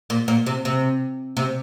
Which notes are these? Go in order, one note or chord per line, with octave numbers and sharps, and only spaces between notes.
A#2
A#2
C3
C3
C3